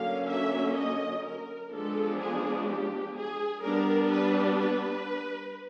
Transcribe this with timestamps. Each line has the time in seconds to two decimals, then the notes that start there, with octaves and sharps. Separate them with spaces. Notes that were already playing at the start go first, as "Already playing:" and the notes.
Already playing: D3 F#3 A#3 C#4 F5
0.29 E5
0.76 D#5
1.24 A#4
1.72 F3 G#3 B3 D4 A4
2.21 G#4
2.68 G4
3.16 G#4
3.64 G3 B3 D4 A#4
4.12 B4
4.60 B4